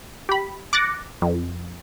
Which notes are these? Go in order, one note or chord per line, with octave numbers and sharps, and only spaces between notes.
G4 B5
D6 F#6 A6 A#6 C#7
F2